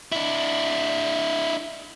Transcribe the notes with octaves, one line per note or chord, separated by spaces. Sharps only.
D4 E4